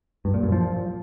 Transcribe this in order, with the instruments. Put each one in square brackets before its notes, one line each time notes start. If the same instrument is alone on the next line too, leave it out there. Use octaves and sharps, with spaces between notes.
[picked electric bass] G2
A#2
F#2
F3